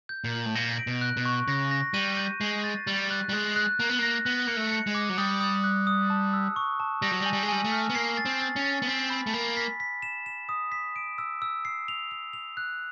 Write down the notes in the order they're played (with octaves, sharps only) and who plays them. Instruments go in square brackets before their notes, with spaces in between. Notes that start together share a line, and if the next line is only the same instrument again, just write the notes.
[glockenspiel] G6
[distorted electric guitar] A#2
[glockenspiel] F#7
[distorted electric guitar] A2
[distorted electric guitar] A#2 [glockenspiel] A#6
[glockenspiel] D7
[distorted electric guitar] B2
[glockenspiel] F#6
[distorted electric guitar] B2
[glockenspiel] C#6
[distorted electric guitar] C#3 [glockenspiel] A#6
[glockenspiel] A#6
[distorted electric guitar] G3 [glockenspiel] D#7
[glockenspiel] G6
[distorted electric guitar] G#3 [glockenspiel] C7
[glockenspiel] A6
[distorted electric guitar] G3 [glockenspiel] A6
[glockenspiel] F#6
[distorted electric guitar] G3
[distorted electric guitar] G#3 [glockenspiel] F#6
[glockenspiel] F#6
[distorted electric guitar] A#3 [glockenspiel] F#6
[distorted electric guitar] B3
[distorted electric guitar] A#3 [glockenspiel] A#6
[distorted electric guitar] B3 [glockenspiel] F#6
[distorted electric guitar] A#3 [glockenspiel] C#7
[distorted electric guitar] A3
[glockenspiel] C#7
[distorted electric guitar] G#3
[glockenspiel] D6
[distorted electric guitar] F#3
[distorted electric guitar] G3 [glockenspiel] D#6
[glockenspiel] D#6
F#6
D#6
A5
E6
C#6
A5
[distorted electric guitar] G3 [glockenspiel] A#6
[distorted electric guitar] F#3
G3
[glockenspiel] G#5
[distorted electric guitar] G3
G#3
[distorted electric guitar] G3 [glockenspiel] G#5
[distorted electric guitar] A3
[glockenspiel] F6
[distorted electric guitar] B3
[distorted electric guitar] A#3 [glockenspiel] C7
[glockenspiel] A6
[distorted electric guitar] C4
[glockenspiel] A6
[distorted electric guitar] C#4
[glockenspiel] A6
[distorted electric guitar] B3
[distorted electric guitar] C4 [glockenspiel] B6
[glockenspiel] B5
[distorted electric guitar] A3
[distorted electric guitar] A#3 [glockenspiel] B5
[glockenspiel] B6
B6
E7
E7
D#6
B6
D7
E6
E6
C7
F7
F7
F7
F#6